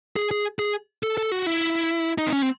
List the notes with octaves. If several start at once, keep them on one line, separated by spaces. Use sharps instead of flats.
G#4
G#4
G#4
A4
A4
F#4
E4
D#4
C4
C#4
C4